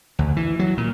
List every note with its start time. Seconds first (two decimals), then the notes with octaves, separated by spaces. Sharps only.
0.19 D2
0.36 E3
0.59 F#3
0.77 A#2